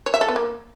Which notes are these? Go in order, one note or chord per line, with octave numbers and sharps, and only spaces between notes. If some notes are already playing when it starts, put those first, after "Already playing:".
C#5
E5
A4
B3
A#3